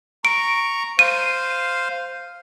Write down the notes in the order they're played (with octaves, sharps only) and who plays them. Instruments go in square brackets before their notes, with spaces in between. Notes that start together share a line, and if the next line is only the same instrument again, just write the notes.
[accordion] A#5 C#6 [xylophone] D7
[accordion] C5 F5 [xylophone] D#7